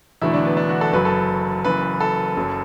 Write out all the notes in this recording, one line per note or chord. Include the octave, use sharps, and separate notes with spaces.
E1 E2 D3 F#3 A3 E4
D4
B3
D4
F#4
A4
F#1 F#2 F#3 B4
A4
F#1 F#2 E3 B4
A4
F#1 F#2 F#3